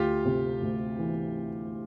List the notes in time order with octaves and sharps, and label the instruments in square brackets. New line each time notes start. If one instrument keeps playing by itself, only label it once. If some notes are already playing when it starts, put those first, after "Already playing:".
Already playing: [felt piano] D2 [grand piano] F4 G4
[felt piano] C3
D2
E3